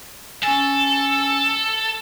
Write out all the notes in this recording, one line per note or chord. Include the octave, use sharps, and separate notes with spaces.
C#4 A4 G#5